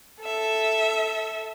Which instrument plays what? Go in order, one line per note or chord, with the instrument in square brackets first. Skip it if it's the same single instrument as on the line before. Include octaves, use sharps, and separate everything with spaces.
[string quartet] A4 E5